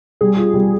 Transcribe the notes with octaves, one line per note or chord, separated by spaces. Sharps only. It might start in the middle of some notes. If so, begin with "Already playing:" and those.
G3 G#4
F4
G3